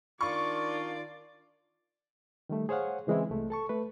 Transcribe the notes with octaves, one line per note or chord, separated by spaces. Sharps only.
D#3 D4 F4 D5 C#6
D#3 G3 A3
G#4 C5 C#5 F5 F#5
C#3 E3 G#3 C4 E4
C2 A3
A4 A5 C#6
A3 B4